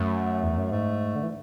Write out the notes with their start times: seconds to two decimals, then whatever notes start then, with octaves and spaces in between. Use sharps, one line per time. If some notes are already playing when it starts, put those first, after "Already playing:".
Already playing: F#2 A3
0.43 E2
0.57 F#2
0.71 G#2 A3
1.16 D3
1.23 E3